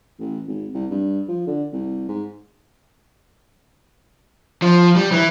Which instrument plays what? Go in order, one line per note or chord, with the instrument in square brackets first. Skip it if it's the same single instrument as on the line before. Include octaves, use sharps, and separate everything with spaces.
[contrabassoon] A1
G#1
C2
G2
F3
D3
C2
G#2
[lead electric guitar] F3
G3
E3